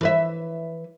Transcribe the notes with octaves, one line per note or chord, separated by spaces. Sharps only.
E3 B4 E5